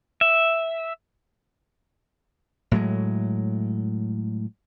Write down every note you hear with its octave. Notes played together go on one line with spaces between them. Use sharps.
E5
A2 F#3 G#3